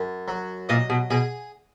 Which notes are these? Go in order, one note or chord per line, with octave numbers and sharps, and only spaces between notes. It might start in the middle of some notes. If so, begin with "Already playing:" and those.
Already playing: F#2
F#3
A#2 D#5
B2
B2 G#4